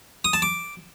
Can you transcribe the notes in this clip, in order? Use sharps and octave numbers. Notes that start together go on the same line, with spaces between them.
D#6
A5
D6